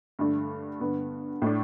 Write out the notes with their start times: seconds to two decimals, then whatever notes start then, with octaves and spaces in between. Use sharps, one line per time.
0.19 G2 D3 A3 D4
0.80 G2 D3 B3
1.42 A2 A3 D4